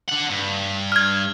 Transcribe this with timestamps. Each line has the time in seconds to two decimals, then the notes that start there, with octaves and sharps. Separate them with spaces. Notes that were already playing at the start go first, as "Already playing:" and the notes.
0.09 D4 F#5
0.31 G2
0.92 F6 G#6